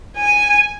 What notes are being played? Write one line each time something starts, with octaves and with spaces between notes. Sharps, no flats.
G#5